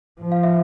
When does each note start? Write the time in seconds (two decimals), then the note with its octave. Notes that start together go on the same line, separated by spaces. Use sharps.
0.20 F3
0.32 F5
0.43 E5